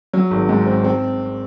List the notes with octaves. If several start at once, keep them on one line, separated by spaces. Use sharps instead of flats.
F#3
G#1
G#2
C4
C4